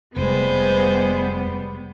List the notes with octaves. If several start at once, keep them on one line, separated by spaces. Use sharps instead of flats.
F1 G3 G#3 B3 C5